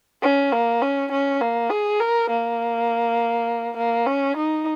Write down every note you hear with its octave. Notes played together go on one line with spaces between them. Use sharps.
C#4
A#3
C#4
C#4
A#3
G#4
A#4
A#3
A#3
C#4
D#4